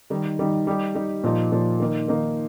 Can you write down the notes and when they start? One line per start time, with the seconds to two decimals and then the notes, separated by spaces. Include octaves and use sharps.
0.10 D#3 G3 D#4
0.39 D#3 G3 D#4
0.67 G3 D#4 G4
0.95 G3 D#4 G4
1.24 A#2 F3 D#4
1.52 A#2 F3 D#4
1.80 D#3 A#3 D#4
2.08 D#3 A#3 D#4